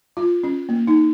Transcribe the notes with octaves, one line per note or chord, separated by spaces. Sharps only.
F4
C#4
A#3
D#4